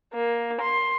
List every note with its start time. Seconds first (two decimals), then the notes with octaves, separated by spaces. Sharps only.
0.14 A#3
0.61 C6